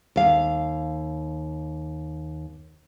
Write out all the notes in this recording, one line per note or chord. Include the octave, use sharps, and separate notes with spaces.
D#2 F5